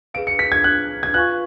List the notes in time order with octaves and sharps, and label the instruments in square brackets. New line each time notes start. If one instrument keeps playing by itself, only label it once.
[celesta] G#4 B4 F5 [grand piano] D7
[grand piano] C#7
B6
G#6
F#6
G#6
[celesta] F4 B4 F5 G#5 C#6 [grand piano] F#6